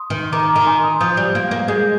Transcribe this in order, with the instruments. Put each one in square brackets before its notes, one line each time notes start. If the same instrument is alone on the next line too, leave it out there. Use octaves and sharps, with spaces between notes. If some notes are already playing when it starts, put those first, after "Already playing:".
Already playing: [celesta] C6 D#6
[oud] D#3
[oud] D#3 [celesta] A#5 D6
[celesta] A#5 D6
[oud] D#3
[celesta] G#5 C6
C6 D#6
[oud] F3 [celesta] D#6 G6
[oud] G3
A#3
A#3
[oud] G#3 [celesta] D#6 G6